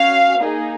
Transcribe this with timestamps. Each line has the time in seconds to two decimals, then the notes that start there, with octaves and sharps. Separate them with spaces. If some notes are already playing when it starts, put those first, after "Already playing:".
Already playing: C#4 F#4 F5
0.40 A#3 D#4 G#4